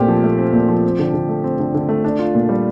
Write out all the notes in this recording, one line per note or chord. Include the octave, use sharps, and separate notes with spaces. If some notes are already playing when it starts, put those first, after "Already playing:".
Already playing: A#2 A3 C4 G4
F3
A3
C4
A#2
F3
C4
D3
D3
A3
C4
D3
D3
A3
D4
F4
A#2
G3